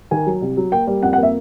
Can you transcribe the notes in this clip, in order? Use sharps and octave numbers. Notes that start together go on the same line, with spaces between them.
D#3 G#5
F#3
C2
F#3
A#3 G5
G3
F2 F#5
F#5
A#3 E5